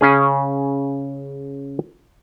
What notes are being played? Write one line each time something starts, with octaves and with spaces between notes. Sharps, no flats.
C#3 C#4 G#4